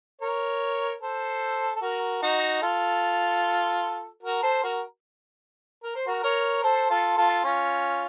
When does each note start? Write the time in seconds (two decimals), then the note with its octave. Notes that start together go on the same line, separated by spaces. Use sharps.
0.21 A#4 C#5
1.01 A4 C5
1.75 A4
1.82 F#4 A#4
2.22 D#4 F#4
2.62 F4 A4
4.23 F#4 A#4
4.43 A4 C5
4.63 F#4 A#4
5.83 A#4
5.95 C5
6.07 F#4 A#4
6.23 A#4 C#5
6.63 A4 C5
6.90 F4 A4
7.17 F4 A4
7.44 C#4 F4